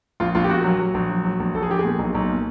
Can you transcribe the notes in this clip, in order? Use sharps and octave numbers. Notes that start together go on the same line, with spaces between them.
A#1 F4
A#1 F4
G4
A#2 F#4
F#3
F#3
A#1
F#3
F#3
A#1
A#1 A4
G#4
A#1 G4
G#4
A#2
B1
B1
A#2